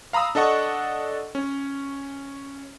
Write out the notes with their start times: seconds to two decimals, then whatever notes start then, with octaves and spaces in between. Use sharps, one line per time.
0.13 F5 A#5 B5 D#6 E6
0.35 D4 A4 D#5 F#5 C#6
1.35 C#4